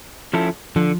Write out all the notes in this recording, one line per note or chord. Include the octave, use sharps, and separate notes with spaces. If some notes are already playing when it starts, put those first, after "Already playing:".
F3 C#4 E4 A4
D3 F3